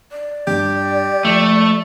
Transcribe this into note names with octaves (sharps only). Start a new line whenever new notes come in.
D5
G2 G4
F3 A3 F#7